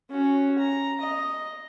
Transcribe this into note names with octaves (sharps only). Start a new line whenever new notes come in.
C#4 F#4
A#5
D#5